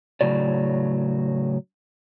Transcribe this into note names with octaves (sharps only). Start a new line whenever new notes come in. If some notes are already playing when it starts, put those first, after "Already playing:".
A2 C#3 F#3 D5